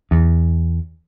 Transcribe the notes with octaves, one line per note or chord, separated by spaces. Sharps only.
E2